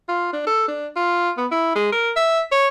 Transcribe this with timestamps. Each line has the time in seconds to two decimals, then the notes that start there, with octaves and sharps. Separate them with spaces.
0.08 F4
0.33 D4
0.47 A4
0.68 D4
0.96 F4
1.37 B3
1.51 E4
1.75 G#3
1.92 A#4
2.16 E5
2.52 C#5